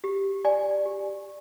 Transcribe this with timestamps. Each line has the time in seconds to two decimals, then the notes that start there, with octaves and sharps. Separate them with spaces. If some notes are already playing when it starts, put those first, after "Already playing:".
0.04 G4
0.45 D5 G#5
0.85 G4